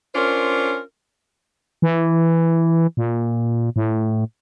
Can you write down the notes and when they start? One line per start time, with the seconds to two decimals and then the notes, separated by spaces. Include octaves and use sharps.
0.15 C#4 D4 F4 A#4 C5
1.82 E3
2.97 A#2
3.76 A2